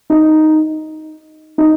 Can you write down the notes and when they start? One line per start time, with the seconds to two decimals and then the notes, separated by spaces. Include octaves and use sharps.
0.10 D#4
1.58 D#4